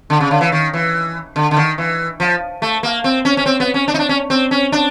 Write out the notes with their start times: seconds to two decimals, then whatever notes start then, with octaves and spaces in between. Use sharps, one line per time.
0.10 D3
0.20 C#3
0.31 D3
0.41 E3
0.52 D#3
0.73 E3
1.36 D3
1.51 D3
1.57 D#3
1.78 E3
2.20 F3
2.62 A3
2.83 A#3
3.04 C4
3.25 C#4
3.37 C#4
3.46 C4
3.60 B3
3.74 C#4
3.88 D4
3.94 D#4
3.99 D4
4.09 C#4
4.30 C4
4.51 C#4
4.72 D4